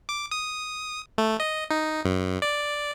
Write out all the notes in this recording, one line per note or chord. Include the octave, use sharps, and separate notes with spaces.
D6
D#6
A3
D#5
D#4
F#2
D5